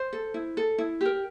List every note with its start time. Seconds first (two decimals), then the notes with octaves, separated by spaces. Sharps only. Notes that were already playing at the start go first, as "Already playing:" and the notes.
Already playing: C5
0.13 A4
0.34 E4
0.57 A4
0.78 E4
1.01 G4 A#4